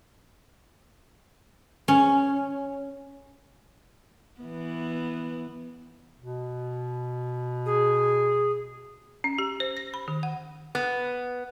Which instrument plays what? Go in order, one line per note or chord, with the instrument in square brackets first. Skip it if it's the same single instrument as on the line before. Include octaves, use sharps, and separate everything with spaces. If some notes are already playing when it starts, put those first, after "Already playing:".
[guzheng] C#4
[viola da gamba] E3 B3
[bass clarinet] B2
[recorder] G#4
[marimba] C#4
G4
C5
A#6
B5
D#3
F#5
[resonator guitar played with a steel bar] B3